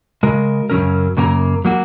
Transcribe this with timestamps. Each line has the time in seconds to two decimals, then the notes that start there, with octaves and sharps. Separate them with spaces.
0.23 C#3 G#3 F#4 A#4
0.70 F#2 C#3 F#3 C#4 A#4
1.17 F#2 C#3 A#3 F#4 A#4
1.65 F#3 A#3 F#4